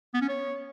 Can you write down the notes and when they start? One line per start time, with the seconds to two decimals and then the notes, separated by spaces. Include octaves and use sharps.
0.14 B3
0.22 C#4
0.29 C#5